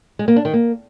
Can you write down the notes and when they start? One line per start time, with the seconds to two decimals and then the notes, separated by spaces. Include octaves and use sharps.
0.19 G#3
0.28 A#3
0.36 D4
0.45 D#3
0.53 A#3